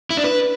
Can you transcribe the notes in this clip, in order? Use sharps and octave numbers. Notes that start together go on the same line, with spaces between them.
E4
D4
B4